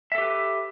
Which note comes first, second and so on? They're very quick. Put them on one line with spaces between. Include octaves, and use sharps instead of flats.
E5 A4 G4 B4